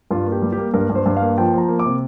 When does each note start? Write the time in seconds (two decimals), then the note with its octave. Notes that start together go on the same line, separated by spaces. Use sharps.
0.11 G2 F4
0.27 A#3
0.32 G4
0.42 G3
0.52 G4
0.58 A#3
0.74 G2 A#4
0.89 G2
0.95 C5
1.06 G2
1.17 F5
1.22 A#3
1.38 F3 G5
1.53 F3 A#5
1.69 A#3
1.79 D6
1.85 C3